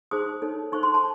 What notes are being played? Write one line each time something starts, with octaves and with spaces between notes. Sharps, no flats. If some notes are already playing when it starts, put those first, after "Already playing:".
D#4 G#4 C5 D#6
D#4 A4 C#5
D#4 A4 C5 C#6
C6
A5